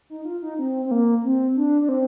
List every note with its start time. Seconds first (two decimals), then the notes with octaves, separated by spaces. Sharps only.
0.10 D#4
0.25 F4
0.42 D#4
0.59 C4
0.86 C4
0.91 A#3
1.24 C4
1.56 D4
1.82 D4
1.89 C4